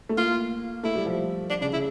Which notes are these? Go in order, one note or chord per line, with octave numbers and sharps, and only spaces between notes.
A3
A#3 F4
A3 E4
G3
F3
D4
C#3 D4
C#3 E4